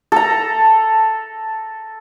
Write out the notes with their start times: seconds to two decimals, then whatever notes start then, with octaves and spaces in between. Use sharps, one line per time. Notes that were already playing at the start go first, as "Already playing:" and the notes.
0.12 A4 A#5